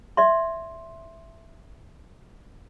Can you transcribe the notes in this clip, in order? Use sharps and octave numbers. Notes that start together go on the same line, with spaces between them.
D5 E5 C6